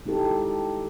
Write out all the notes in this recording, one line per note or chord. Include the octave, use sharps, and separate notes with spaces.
G#3 D#4 E4 G4 A4